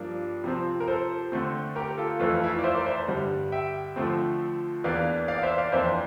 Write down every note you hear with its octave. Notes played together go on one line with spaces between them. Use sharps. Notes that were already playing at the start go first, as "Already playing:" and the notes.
Already playing: G2 F3 A#3 D4
C3 F3 C4
A#4
A4 C5
D3 A3 C4
G4 A#4
F4 A4
F2 E3 A3 F4 A4
E4
F4
D5
C5 E5
A#4 D5
C5 E5
G2 D3 G3
E5 G5
D3 F3 A3 C4
E2 E3 A#3 D4 D5 F5
D5 F5
F5
C5 E5
D5 F5
F2 E3 A#3 D4 C5 E5